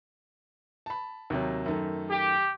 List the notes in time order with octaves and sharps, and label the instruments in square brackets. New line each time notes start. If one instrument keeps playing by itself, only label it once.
[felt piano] A5 B5
D#2 C3 F#3
F#2 D#3 A3
[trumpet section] G4